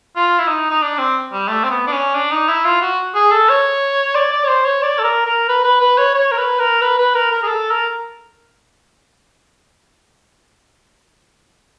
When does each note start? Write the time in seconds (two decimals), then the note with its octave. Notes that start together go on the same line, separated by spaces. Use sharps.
0.16 F4
0.39 E4
0.48 D#4
0.71 D#4
0.82 D4
0.98 C4
1.32 G3
1.48 A3
1.64 C4
1.70 B3
1.87 D4
1.92 C#4
2.15 D4
2.32 D#4
2.49 E4
2.65 F4
2.81 F#4
3.15 G#4
3.32 A4
3.49 C#5
4.15 D5
4.32 D5
4.44 C#5
4.48 C5
4.65 C#5
4.82 D5
4.99 A4
5.04 A#4
5.26 A#4
5.49 B4
5.64 B4
5.81 B4
5.98 C#5
6.14 C#5
6.31 A#4
6.38 B4
6.59 A#4
6.82 B4
6.98 B4
7.15 A#4
7.31 A#4
7.43 G#4
7.48 A4
7.71 A#4